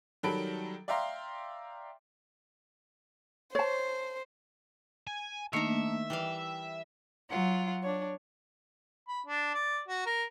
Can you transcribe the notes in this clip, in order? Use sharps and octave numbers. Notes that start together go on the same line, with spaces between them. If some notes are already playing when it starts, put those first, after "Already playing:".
D#3 F#3 G3 A4 B5 D7
D5 E5 F5 G5 A#5 C6
C5 C#5 A5
G#5
D#3 A3 A#3 D4 E5 A#5
E3 G3 F5 G5
F#3 F4 F#5
D4 C#5
B5
D4
D5
F#4
A#4